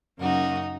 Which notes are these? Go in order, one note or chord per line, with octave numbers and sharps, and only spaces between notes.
F#2 C#3 F#3 A#3 D#4 F#4